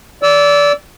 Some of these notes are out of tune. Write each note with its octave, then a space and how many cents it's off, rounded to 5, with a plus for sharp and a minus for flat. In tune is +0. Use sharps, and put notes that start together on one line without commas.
D5 -25 E6 +0